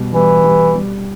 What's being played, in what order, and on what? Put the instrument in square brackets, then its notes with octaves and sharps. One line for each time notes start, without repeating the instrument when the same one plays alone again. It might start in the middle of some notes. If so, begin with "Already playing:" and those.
Already playing: [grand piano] B2 G3
[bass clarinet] E3 [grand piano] G3
[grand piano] G3
G3